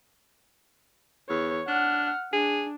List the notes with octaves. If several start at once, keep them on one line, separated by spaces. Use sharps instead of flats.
E2 C#5
D4 F#5 F6
D4 G#4